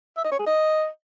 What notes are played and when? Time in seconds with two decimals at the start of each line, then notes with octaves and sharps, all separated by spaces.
0.17 E5
0.24 D#5
0.32 C#5
0.39 G#4
0.46 D#5